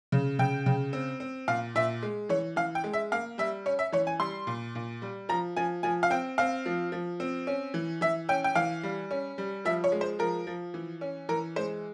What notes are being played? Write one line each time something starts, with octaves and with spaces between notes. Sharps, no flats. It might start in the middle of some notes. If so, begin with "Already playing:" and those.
C#3
C#3 G5
C#3
C4
C4
A#2 F5
A#2 E5
G#3
E3 C#5
E3 F5
G5
G#3
E5
A#3 F5
G3 E5
C#4 C#5
E5
E3 C#5
G#5
G3 C6
A#2
A#2
G3
F3 A#5
F3 G#5
F3 G#5
F5
C4 G5
C4 F5
F3
F3
C4
C#4
E3
E3 E5
C#4 G5
G5
E3 F5
G3
C#4
G3
F3 E5
C#5
G#3
C5
F3 A#4
F3
E3
C#4
E3 A#4
G#3 C5